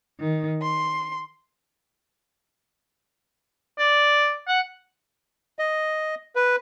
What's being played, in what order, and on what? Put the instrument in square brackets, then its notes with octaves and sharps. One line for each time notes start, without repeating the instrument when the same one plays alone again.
[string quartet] D#3
C6
[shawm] D5
F#5
[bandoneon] D#5
B4